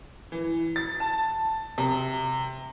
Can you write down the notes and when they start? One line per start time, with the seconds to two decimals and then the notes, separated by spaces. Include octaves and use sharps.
0.32 E3
0.76 A6
1.00 A5
1.78 C3